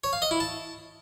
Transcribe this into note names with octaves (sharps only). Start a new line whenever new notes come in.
C#5
F5
D#5
E4
A5